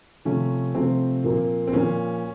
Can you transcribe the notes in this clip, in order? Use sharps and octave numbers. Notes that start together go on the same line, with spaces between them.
C3 F3 A3 C#4
C3 F3 A3 C4
A#2 F3 A#3
C4
A#2 F3 A#3 C#4